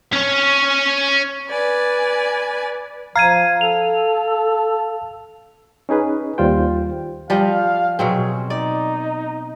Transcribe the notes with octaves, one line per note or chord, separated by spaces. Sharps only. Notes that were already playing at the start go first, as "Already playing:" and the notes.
C#4 C#5
B4 D5 G#5
F3 F5 A#5 G#6 D#7
A4 F7
C#4 D#4 G#4 B4
D#2 G3 F4 C5 G5
F3 G3 D#5 F5
B2 F#3 C4 G#4
D#4 D5